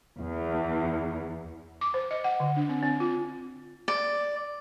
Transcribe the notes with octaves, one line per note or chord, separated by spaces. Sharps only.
E2
D6
C5
D#5
F#5
D3
D4
C4
C4
F4
D5